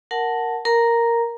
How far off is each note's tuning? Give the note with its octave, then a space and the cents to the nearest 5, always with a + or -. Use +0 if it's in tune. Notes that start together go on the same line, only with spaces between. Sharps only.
A#4 +0 F#5 +0 A5 +0
A#4 +0 A#5 +0